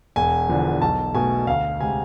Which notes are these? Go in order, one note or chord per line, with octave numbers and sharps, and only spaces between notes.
E1 G#5
E2 D3 F3
B1 A5
B2 A3 G#5
D2 F5
C3 G#3 G#5